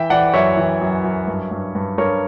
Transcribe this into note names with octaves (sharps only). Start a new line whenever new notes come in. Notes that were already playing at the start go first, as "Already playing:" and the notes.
Already playing: E3 E5 G5
E3 D5 F#5
F#2 C#5 E5
E3
F#2
F#2
G2
G2
G2
G2 A#4 C#5